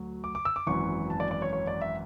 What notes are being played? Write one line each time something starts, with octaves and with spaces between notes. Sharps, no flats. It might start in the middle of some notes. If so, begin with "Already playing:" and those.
Already playing: D2 F#3
D6
D6
E6
D6
G#1 F#2 E3 C#6
A5
D5
D5
C#5
C#5
D5
E5